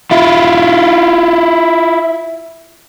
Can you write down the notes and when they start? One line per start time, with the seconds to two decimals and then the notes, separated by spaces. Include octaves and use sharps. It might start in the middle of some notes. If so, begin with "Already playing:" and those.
0.11 E4 F4